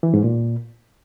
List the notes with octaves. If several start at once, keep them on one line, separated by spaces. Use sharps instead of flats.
E3
G#2
A#2